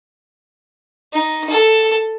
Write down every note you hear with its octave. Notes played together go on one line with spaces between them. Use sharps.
D#4
A4